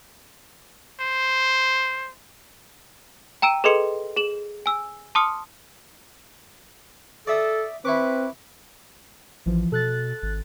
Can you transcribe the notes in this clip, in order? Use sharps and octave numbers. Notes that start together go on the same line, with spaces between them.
C5
G5 A#5 E6 D7 D#7
G#4 A4 B4 D#5 C6 C#7
G#4 E7 F#7
G#5 E6
A5 C6 D6 D#6 F6 C#7
A4 D5 E5 D#6
C4 E4 B4 C#6 D6
A1 E3 F3
B2 A4 F#6 A6
G#1